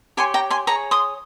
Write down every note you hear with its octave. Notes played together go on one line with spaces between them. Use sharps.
G4 C#5 G#5 C6
G5 A#5
G#5 C6
G#4 C#5 A#5 C#6
C6 D#6